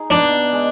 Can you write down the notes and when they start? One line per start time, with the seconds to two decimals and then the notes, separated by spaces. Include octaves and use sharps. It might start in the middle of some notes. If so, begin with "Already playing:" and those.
Already playing: D#4 G#4
0.10 B2 D4
0.52 G#3